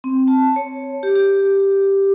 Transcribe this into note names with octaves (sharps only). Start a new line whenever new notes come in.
C4
A5
C#5
G4
G4